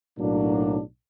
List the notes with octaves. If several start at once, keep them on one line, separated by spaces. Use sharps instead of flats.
B1 A2 F#3 A#3 D4